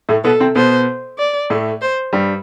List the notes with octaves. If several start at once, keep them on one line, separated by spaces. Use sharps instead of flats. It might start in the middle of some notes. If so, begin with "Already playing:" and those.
A2 A3
B2 B3 A4
C3 C4
B2 B3 C5
D5
A2 A3
C5
G2 G3